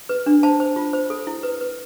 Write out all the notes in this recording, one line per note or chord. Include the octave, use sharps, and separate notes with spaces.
B4
D4
C5 A5
C5
F4
C5
A4
E4
B4
B4